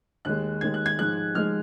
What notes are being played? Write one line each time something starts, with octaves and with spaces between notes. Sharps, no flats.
D#2 D#3 G#3 F#6
D#2 D#3 G#3 G#6
F#6
G#6
G#2 F3 G#3 F#6
G#2 F3 G#3 F6